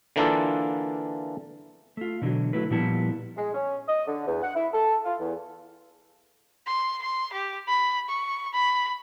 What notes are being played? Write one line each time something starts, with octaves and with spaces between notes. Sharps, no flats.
D3 E3 A#3 D4 F4 A4
A3 F4
B2 D3 E3 F#3
F#3 A3 E4 B4
A#2 F3 G3 B3 E4 A5
G#3
C#4
D#5
D3
E2
F#5
E4
A4
F4
E2
C6
C6
G4
B5
C#6
B5